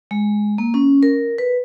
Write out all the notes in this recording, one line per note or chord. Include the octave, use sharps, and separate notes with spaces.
G#3
A#3
C#4
A#4
B4